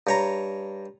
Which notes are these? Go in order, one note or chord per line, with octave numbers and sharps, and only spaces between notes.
G2 C#5 A#5